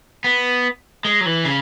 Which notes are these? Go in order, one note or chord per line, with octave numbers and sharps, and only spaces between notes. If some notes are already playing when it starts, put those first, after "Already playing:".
B3
G#3
F#3
E3
C#3